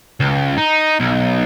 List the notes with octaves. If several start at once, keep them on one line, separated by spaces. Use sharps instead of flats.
C#2
D#4
B1